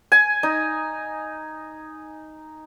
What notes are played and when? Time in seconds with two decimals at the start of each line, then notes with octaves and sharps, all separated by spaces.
0.12 G#5
0.43 D#4